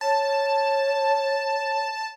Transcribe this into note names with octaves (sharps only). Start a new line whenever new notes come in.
C#5 A5